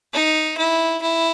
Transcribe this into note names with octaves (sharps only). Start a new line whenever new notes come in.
D#4
E4
E4